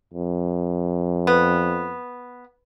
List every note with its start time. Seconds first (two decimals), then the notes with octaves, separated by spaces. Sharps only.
0.14 F2
1.27 B3